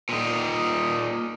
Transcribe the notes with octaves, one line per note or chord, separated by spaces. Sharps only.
A#2 D#4